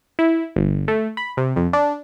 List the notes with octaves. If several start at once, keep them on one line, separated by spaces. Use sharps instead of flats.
E4
G1
A3
B5
C3
F2
D4